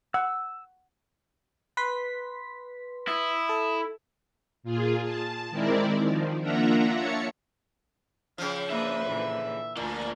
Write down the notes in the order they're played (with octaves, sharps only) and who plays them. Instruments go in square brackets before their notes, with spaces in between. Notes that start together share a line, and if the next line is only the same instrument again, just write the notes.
[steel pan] F#5 [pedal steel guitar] E6
[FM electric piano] B4 C6 B6
[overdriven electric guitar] E4 [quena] D#6
[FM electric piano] A4
[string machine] A#2 F4 G#4
A5
D#3 G#3 C4 E4 A#4 D5
D#3 F3
A#3 D4 F4 E5 F#5 A#5
C#5 E5 A5 C#7
[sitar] C#3 F3 [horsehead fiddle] F5 G5
[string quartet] A#3 D4 D#6 [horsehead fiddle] B4 C5 [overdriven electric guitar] E5
[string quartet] A#2 D3 E3
[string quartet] D2 [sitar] A#2 [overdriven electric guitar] A#3 D4 [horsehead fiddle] F4